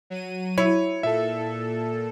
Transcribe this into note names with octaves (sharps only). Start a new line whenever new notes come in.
F#3 D#7
E4 C#5
A#2 A4 E5